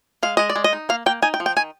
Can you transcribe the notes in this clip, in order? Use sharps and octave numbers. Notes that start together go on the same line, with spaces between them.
G#3 F5
G#3 D#5
D5
G#3
D#5
D#4
A#3 F5
A#3 G5
D#4 G#5
G5
F3
G5
D#3 G#5